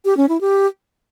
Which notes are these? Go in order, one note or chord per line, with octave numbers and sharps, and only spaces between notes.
G4
C#4
E4
G4